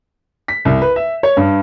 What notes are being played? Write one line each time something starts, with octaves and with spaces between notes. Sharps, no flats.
B6
C2
B4
E5
C#5
G2